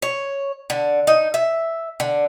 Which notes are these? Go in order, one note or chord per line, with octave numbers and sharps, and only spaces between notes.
C#5
D3
D#4
E5
D3